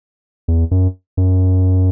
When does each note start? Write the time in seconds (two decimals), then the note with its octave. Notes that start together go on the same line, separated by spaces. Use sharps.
0.48 E2
0.71 F#2
1.17 F#2